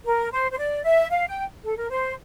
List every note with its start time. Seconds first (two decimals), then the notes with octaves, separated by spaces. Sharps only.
0.05 A#4
0.31 C5
0.52 C5
0.58 D5
0.84 E5
1.10 F5
1.28 G5
1.64 A4
1.76 A#4
1.89 C5